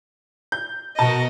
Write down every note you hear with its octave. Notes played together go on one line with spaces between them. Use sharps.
G6
B2 F#4 A#4 D#5 A5